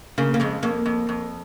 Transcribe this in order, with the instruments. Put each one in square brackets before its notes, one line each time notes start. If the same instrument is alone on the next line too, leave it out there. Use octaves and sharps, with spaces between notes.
[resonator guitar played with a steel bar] C#3 [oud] A#3
[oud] A#3
[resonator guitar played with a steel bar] F2 [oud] G#3
[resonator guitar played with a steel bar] F2 [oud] A#3
[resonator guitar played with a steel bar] F2
F2